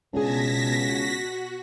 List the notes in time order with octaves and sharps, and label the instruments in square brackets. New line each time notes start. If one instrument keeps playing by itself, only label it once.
[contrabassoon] C#2 [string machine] B2 A5 G#6 [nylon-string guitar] D4 G#4 [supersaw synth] A#6 B6
[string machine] F#4